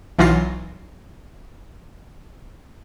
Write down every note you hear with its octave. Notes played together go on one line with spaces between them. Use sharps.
B1 E3 F#3 F4 A#6 C7